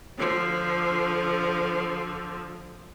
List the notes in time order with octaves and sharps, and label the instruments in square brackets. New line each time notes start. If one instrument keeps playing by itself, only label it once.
[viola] D3 F3